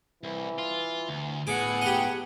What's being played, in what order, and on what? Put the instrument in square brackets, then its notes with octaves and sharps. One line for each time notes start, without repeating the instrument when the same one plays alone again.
[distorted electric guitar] C2 [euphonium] E3
[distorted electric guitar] F4
D2
[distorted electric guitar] A2 [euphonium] B3 [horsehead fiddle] G#4 F#5 [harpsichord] D6
[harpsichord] G4 D#5